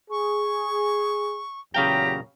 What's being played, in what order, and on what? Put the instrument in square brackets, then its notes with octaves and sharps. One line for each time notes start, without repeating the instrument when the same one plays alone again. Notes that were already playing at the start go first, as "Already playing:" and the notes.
[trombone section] G#4 [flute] C#6
[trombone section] E2 A#2 F#3 [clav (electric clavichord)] C#3 F5 G5 [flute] G4 [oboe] A#5